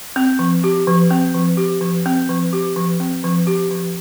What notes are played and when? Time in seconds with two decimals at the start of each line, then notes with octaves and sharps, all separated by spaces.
0.16 C4
0.39 F3
0.64 G4
0.87 F3
1.11 C4
1.34 F3
1.57 G4
1.81 F3
2.06 C4
2.29 F3
2.53 G4
2.76 F3
3.00 C4
3.24 F3
3.47 G4
3.71 F3